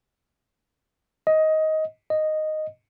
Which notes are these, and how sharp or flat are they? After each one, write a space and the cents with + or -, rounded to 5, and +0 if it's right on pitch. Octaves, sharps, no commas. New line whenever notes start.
D#5 +15
D#5 -5